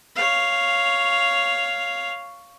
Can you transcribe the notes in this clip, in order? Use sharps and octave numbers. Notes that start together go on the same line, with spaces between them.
C#5 F5